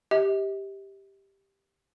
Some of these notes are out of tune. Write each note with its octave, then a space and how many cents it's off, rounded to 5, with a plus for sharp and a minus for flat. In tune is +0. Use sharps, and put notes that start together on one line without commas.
G4 +0 D#5 +45